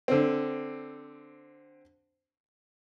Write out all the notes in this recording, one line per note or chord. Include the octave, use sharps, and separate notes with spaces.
D3 C4